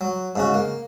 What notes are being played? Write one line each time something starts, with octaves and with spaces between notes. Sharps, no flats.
F#3
G#2 C#3 F#4
A#3